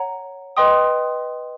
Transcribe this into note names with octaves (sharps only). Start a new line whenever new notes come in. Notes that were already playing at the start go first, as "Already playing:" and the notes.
Already playing: C#5 F#5 A#5
B4 D#5 G5 C6 D#6